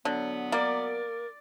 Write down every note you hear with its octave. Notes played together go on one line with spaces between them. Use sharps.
D3 F#3 B3
A#3 A#4 D5